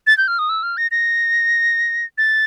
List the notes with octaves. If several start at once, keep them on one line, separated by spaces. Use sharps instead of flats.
A6
G6
F6
D#6
E6
F6
A#6
A#6
A6